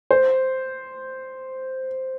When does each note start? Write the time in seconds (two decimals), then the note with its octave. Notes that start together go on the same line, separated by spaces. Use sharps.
0.11 C5